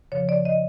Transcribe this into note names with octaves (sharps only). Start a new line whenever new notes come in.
F2 C#3 F3 C#5
D5
D#5